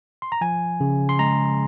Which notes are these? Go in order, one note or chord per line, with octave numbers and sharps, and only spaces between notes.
C6
A#5
F3 G#5
C#3
C6
G#3 A#5